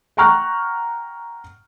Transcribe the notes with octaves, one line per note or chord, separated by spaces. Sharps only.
F#5 G5 A#5 C#6 F6 F#6